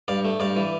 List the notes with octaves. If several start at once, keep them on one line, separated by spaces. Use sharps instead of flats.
G2 D5 F5
A3
G2 D5 F5
E3